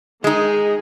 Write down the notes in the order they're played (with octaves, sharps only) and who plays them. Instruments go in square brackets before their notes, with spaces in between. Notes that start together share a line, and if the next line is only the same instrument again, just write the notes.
[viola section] D#3 G#4 [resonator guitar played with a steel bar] G#3 D#4